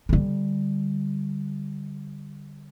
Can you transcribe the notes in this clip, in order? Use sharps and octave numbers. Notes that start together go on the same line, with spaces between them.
D3 G3